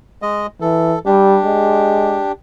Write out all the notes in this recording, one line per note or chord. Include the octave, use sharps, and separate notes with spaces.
G#3 D#5
E3 A4
G3 D4 G4
G#3